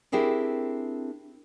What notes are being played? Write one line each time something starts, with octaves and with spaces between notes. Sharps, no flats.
C4 D4 E4 G4 G#4 A#4